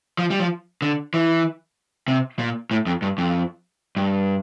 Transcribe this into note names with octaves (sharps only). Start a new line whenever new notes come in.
F3
G3
F3
D3
E3
C3
A#2
A2
F2
G2
F2
G2